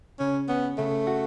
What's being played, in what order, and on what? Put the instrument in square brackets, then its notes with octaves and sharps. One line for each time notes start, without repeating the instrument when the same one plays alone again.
[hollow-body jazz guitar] C#3 [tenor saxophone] C#4
[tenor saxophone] B3 [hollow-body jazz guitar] C#4
[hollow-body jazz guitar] C#3 [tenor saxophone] A3
[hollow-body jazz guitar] F#4